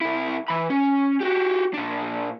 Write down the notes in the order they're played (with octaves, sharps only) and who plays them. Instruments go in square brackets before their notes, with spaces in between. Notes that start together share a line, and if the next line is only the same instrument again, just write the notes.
[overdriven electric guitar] C3 E4
E3 B5
C#4
F#4 G4
A#2 D4